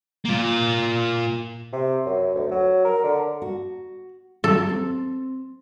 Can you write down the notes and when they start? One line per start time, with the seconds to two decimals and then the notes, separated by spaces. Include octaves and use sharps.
0.25 A#3 F4
1.73 C3
2.06 F#2
2.35 D2
2.51 F#3
2.85 A#4
3.04 D3
3.42 F#4
4.44 F#3 A4
4.69 C4